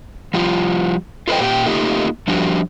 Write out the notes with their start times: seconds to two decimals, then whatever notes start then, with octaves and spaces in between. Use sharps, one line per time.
0.34 F3 G3 F4
1.28 F4 A4 B4 C5 D#5 G5
1.40 A#2 G4 A#4 G5
1.66 A3 A#3 D#4 F4 G4
2.28 F3 G3 D4 F#4 G4